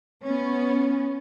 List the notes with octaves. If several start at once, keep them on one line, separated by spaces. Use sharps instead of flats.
B3 C#4